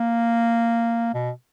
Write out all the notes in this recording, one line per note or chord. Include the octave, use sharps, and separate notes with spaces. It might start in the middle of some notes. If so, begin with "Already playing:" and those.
Already playing: A#3
B2